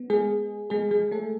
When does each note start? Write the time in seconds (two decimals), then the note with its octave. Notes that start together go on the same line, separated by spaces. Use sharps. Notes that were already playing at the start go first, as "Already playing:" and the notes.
Already playing: B3
0.10 G#3 G#4
0.70 G#3 G#4
0.91 G#3 G#4
1.11 A3 A4